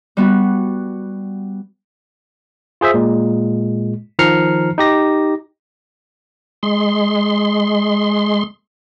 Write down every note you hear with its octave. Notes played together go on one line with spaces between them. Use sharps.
G3 B3 F#4
F4 G#4 C5 E5
A#2 G#3
D#3 F3 A#5 F6 C7 C#7
D#4 G4 A#6
G#3 C6